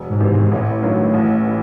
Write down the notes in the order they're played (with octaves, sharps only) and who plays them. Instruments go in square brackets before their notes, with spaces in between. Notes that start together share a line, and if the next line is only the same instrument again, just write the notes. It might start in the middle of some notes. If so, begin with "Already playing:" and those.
Already playing: [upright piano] E1
[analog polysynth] G#2
[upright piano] E2 C3 D#3
[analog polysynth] G#2
[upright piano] A1 [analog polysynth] A2
[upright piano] G2 D#3 F#3
A1
E3